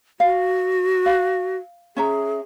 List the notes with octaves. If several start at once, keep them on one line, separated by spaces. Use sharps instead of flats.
F#4 F5
F5
C#4 G#4 E5 A#5